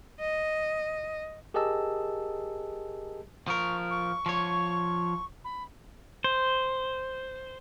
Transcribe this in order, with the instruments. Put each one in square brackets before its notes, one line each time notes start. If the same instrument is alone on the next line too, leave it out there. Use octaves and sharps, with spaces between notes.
[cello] D#5
[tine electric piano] G4 G#4 A#4 D#5 A5 E6
[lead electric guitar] F3 A#4 [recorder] C#6
[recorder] C#6
[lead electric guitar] F3 C#5
[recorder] B5
[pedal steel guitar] C5